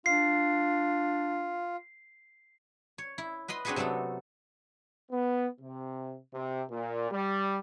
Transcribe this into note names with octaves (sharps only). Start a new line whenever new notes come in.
D4 F4 C7
C#5
E4
B4 D#5 B5 C6
C4 D4 F#4 G#4 A4 B4
C3 F#3 A3 B3 A4
B3
C3
C3
A#2
G3